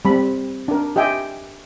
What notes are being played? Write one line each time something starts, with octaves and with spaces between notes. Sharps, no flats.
G3 C4 B5
D4 A#4
G4 D#5 E5 G5 G#5